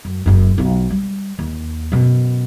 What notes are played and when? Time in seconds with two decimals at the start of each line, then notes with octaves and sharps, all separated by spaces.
0.05 F#2
0.26 F#1 F#2
0.58 B1 F4
0.90 G3
1.39 D#2
1.92 F#2 B2